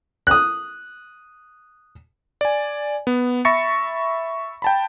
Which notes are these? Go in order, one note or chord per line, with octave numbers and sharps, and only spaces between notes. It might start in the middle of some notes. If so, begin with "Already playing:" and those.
D#6 F#6
D5 G#5
B3
E5 B5 C#6 A6 A#6 C#7
G5 A5 B5